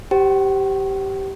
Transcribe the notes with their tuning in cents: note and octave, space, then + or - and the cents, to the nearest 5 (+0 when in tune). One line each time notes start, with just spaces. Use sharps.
G4 -10 C5 +0 F#5 +45